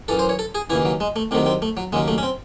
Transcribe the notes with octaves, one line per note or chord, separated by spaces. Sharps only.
F#2 E3 A4
C5
C#5
A4
G#4
D#2 C#3 E3 E4
F#3
G#3
A3
C2 C3 D#3 F#3 A3
C4
A3
F#3
D#2 C#3 F#3 G#3
A3
C#4
C4